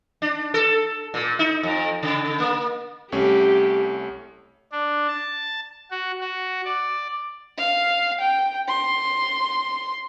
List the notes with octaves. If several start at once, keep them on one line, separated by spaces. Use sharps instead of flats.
D4
A4
A#2
D#4
F2
C#3
A#3
C2 A3 C#4 G4
D4
A5
F#4
F#4
D5
F5
G5
C6